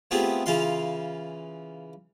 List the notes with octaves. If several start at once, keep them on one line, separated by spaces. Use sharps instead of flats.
A3 B3 C4 F4 G4 G#4
C#3 E3 F4 F5 C6